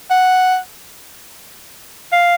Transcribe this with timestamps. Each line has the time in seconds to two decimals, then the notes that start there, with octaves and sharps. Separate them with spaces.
0.10 F#5
2.12 F5